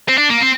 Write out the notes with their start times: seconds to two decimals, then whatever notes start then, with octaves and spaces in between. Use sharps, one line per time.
0.08 C4
0.18 D4
0.30 A#3
0.41 C4